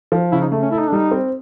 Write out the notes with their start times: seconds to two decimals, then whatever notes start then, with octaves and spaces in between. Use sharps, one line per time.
0.12 F3
0.32 C#3 E4
0.42 D#4
0.52 A3
0.62 C#4
0.72 E4 A4
0.79 D#4
0.88 D4
0.92 G3 D#4
1.11 C4